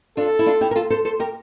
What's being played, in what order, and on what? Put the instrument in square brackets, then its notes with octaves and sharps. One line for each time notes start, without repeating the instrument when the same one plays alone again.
[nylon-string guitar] D4 F4 [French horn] A4
[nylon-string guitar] E4
D4 F4
E4 G4
A#4
F4 A4
A4 C5
A4 C5
G4 A#4